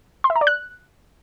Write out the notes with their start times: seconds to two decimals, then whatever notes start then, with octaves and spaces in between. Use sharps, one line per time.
0.24 C6
0.30 E5
0.36 A#5
0.41 D5
0.47 F#6